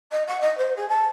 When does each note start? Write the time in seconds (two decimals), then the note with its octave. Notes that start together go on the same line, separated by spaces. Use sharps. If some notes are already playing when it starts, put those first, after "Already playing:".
0.11 D#5
0.27 F#5
0.40 D#5
0.57 C5
0.76 G#4
0.88 A5